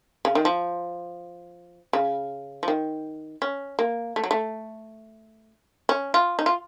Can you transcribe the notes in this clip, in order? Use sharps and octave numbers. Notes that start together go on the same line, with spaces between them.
C#3
D#3
F3
C#3
F3
D#3
C#4
A#3
A3
F#3
A3
C#4
F4
D#4
F4